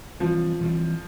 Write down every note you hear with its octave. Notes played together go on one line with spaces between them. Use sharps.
E3 F3 G3 C4
E3 G3 C4